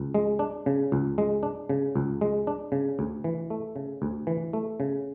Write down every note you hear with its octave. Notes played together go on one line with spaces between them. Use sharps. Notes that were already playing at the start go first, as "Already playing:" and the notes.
Already playing: C#2
G#3
D4
C#3
C#2
G#3
D4
C#3
C#2
G#3
D4
C#3
D2
E3
A3
C#3
D2
E3
A3
C#3